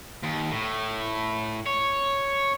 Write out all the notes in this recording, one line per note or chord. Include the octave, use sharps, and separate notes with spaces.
D#2
A2
C#5